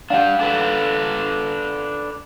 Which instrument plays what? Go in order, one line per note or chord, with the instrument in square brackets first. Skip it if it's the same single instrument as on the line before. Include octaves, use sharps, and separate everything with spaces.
[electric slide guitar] D4 G4 [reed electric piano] F5 F#5
[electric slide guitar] D4 A4 B4